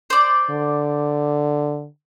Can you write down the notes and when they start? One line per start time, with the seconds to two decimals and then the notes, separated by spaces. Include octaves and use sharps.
0.10 C5 D5
0.50 D3